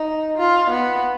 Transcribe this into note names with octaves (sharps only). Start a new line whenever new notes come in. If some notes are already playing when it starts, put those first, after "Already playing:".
Already playing: D#4
F4
B3